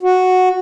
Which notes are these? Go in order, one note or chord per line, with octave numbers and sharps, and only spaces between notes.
F#4